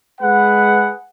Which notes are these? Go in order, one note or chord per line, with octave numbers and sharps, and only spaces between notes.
G#3 G#4 B4 F#5